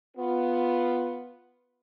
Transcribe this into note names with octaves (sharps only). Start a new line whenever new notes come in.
B3 F4